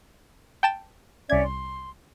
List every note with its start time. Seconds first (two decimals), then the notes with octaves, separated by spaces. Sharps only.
0.63 G5 A5 E7
1.30 C2 C#4 D5 E5 G#6
1.43 C6